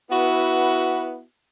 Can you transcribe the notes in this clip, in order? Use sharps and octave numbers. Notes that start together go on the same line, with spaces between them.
B3 E4 F#4 B4